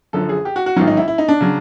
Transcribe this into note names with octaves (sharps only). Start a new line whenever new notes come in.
F#1 F#2 D3 F3 A4
G#4
G4
F#4
F#4
A1 G#2 D#3 F#3 F4
D#4
E4
E4
D#4
D4
C#3 F#3